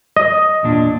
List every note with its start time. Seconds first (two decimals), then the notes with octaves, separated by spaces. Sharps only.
0.17 D#5
0.63 E2 A#2 D4